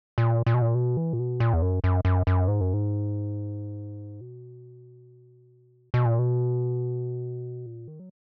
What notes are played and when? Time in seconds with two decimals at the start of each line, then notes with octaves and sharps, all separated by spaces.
0.18 A#2
0.46 A#2
0.54 B2
0.62 A#2
0.75 B2
0.97 E3
1.13 A#2
1.19 B2
1.40 A#2
1.53 E2
1.62 F#2
1.84 F#2
2.05 F#2
2.27 F#2
2.48 G#2
2.61 F#2
2.73 G#2
4.21 B2
5.94 B2
6.06 A#2
6.19 B2
7.66 A#2
7.88 D#3
7.99 F#3